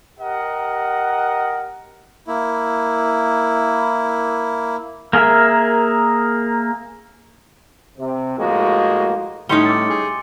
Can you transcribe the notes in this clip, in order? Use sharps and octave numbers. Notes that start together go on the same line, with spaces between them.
G4 A#4 D#5 F#5
A#3 E4
A#3 G#4 A#4 E5
C3
A2 F3 G#3 A#3 F#4
A2 G3 C#4 D#4 C6 C#7 G7
D6 E6 A6
G#4